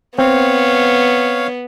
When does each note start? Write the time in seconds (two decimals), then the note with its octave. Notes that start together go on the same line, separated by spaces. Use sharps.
0.18 B3 C4 C#5 F5